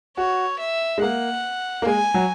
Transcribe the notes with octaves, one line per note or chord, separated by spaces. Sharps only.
F#4 C#5
E5
G#3
A#3 F#5
A#3
G#3 G#5
F#3